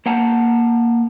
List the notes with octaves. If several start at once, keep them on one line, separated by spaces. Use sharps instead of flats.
A#3 F#5 A5 A#5